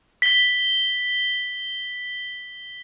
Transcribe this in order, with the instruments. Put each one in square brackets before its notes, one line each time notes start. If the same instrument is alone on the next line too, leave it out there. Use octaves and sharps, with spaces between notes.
[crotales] B6 G7